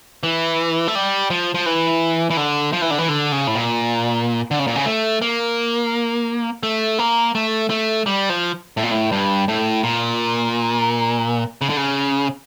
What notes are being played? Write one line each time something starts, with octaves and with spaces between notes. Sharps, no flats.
E3
A3
G3
F3
F3
E3
E3
D3
F3
E3
D3
E3
D3
C#3
A2
A#2
D3
C#3
A#2
C#3
A3
A#3
A3
A#3
A3
A3
G3
F3
A2
A#2
A2
G2
A2
A#2
C#3
D3
C#3